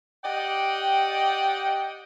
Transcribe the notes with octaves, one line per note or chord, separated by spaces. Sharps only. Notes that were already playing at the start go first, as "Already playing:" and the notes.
G4 D5 D#5 F#5 G5